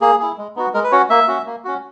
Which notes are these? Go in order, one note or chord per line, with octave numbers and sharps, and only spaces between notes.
A#3 G#4
E4 G#4
G#3
B3 D#4 F#4
G#3 A#4
B4
C#4 F#4 C#5
A#3 E5
C#4 F#4
A#3
C#4 F#4